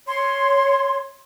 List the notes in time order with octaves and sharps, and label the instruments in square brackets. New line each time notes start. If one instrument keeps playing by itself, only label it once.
[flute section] C#5 C6